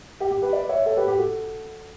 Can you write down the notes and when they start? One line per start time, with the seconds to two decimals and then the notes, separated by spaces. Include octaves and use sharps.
0.20 G4
0.31 G4
0.42 G4 B4
0.53 B4 D5
0.69 C#5 E5
0.86 A4 C#5
0.97 G4 B4
1.07 G4
1.19 F#4 A4